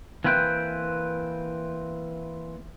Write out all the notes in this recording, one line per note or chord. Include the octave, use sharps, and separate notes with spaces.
E3 A#3 C4 B4 G5